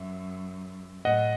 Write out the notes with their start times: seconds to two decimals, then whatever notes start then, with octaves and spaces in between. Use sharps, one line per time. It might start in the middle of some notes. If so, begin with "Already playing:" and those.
Already playing: F#2 E5
1.05 A2 D#5 F#5